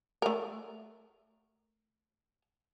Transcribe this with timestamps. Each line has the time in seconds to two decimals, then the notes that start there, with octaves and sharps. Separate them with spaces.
0.22 A3 A#4